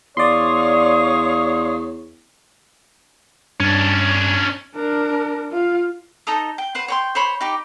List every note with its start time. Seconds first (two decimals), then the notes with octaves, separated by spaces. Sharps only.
0.17 E2 C#5 D5 F5 C6 C#6 D#6
3.60 G2 C#4 D4
4.75 D4 A#4
5.51 F4 F5
6.27 D#4 A4 A#5 D#6
6.58 G5
6.75 B4 C5 F#5
6.88 C#5 G5 C6
7.15 C5 C#5 B5 C6
7.41 D#4 G4 D6